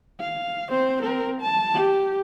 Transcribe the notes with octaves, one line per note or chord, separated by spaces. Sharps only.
F5
C4 C5
C4 A#4
A5
G4